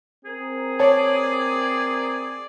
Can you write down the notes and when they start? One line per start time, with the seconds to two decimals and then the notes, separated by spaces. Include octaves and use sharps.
0.25 C4 G#4 A#4
0.80 C#5 D5 A5